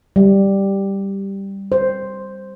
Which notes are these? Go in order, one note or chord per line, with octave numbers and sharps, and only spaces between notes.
G3
C5